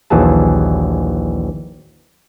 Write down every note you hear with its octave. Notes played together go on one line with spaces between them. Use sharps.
A#1 D#2 E3 F#3 G#4 A5